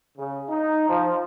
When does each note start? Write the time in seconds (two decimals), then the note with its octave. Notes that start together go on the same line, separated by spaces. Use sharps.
0.17 C#3
0.49 D#4
0.89 F3